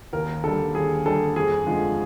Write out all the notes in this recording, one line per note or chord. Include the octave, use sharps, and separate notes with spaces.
D#2 A#4
D3 G3 A4
D#2 G#4
D3 G3 A4
F2 G#4
D3 F3 G#3